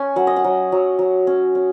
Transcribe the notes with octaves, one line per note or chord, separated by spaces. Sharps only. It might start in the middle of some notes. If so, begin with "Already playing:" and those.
Already playing: C#4 G#5 C#6
F#3 F#5
D#5
F#5
F#3
F#3
F#3
C#4
C#4